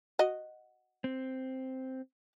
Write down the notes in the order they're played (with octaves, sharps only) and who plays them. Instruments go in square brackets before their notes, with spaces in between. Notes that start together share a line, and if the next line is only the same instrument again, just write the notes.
[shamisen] F#4 D#5
[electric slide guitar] C4